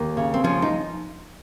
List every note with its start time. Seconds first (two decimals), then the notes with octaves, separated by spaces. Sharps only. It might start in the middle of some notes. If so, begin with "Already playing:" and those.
Already playing: D#2
0.17 C#3
0.34 C4
0.44 F3 C#4
0.62 D#4